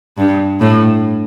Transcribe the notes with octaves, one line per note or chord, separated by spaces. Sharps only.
G2
A2